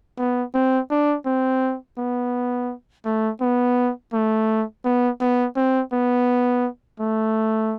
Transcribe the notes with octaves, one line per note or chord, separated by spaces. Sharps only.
B3
C4
D4
C4
B3
A3
B3
A3
B3
B3
C4
B3
A3